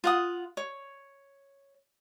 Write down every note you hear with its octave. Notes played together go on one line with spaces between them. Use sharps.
F4 F#5 D#6
C#5